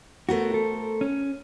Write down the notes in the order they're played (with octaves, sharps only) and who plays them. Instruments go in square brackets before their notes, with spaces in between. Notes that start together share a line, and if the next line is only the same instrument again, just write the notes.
[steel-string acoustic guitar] A3 A#4 C5 [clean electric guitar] B3 F#4
[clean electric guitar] A4
C#4